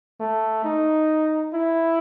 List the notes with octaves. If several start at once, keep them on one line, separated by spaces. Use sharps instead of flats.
A3
D#4
E4